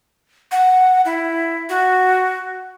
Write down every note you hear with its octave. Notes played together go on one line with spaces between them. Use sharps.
F#5
E4
F#4